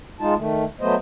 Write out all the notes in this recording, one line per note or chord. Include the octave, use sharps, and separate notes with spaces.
G#3 D#4 F4 A5
D#3 A3
F#3 A3 B3 C5 D#5